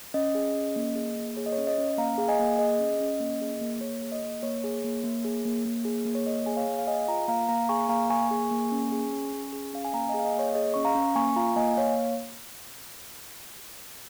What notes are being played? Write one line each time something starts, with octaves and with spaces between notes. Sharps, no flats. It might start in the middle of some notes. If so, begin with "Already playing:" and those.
C#4 D#5
G#4
C#4
A#3
G#4
A#3
G#4 C#5
D#5
C#5
C#4
D#5
C#4
A#3 F5 A#5
G#4 F5
D#5 G#5
A#3
G#4 D#5
C#4
C#4
A#3
G#4
A#3
A#3 C#5
G#4
D#5
A#3
A#3 C#5
G#4
A#3
A#3
G#4
A#3
A#3
G#4
A#3
C#5
A#3 D#5
G#4 G#5
C#5 F5
A#3
F5
G#4 D#5 G#5
F4 F5 A#5
A#3 F5 A#5
A#3 F5 A#5
G#4 G#5 C#6
A#3 F5 A#5
A#3 G#5 C#6
G#4
A#3
C#4
G#4
C#4
C#4
G#4
C#4 F5
G#5
A#3 F5 A#5
G#4 D#5 G#5
F5
D#5
A#3 C#5
G#4 D#5
C#4 C#6
F5 A#5
C#4
A#3 G#5 C#6
F4 F5 A#5
A#3 D#5 G#5
A#3 C#5 F5